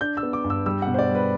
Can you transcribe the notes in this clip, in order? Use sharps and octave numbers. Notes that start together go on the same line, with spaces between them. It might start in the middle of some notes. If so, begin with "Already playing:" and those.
D4 G6
E6
B3
D6
G2
E6
G3 E6
F#5
B2
C5
D5
G3
B4